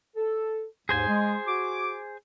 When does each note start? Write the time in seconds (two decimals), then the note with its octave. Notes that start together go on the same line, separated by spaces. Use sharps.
0.16 A4
0.89 D#2 G#2 G#4 C5 G#5
1.08 G#3
1.47 F#4 D6